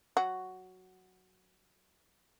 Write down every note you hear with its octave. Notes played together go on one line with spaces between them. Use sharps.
F#3 F#4